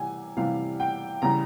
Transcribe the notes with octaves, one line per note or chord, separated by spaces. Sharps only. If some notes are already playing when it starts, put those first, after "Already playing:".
Already playing: C3 E3 G3 G#5
C3 E3 G3 F5
G5
C#3 E3 G3 A#5